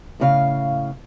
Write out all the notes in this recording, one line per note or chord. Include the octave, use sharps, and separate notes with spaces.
A2 C#3 F5